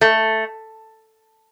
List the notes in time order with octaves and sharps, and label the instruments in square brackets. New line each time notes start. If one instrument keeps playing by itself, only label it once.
[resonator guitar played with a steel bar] A3